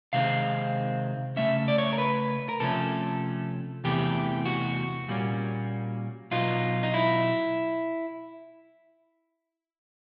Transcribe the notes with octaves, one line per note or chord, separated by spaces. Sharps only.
C3 D#3 G#3 C4 F5
C#3 F#3 A3 C#4 E5
D5
C#5
A#4
B4
A#4
C3 F3 A3 C#4 A4
E2 C3 E3 A3 G4
F#4
A#2 G3 A#3 C#4
B2 F#3 B3 D#4 F4
D#4
E4